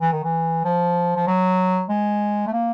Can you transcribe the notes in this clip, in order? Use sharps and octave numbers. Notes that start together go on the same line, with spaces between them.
E3
D#3
E3
F3
F3
F#3
G#3
A3
A#3